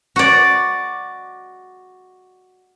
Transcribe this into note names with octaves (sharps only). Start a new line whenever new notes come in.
F#4 D5